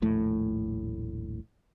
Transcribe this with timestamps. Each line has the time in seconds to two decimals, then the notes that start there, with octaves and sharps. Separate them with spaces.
0.02 D#1 A#1 A2 A3